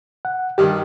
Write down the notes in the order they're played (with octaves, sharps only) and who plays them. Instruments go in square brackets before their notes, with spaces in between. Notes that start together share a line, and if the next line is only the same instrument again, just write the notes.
[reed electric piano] F#5
[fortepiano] G2 D#3 G3 [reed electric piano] G4